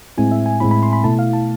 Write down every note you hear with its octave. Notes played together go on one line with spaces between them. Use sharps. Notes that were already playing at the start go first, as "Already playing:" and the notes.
A2 G#3 C4 E4 G#5
E5
G#5
A2 G#3 C4 E4 B5
B5
C6
B5
B2 A3 E4 A5
F5
A5